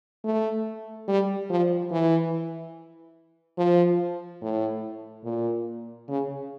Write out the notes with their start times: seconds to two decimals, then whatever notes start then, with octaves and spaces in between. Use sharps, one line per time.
0.24 A3
1.08 G3
1.50 F3
1.91 E3
3.58 F3
4.41 A2
5.24 A#2
6.08 C#3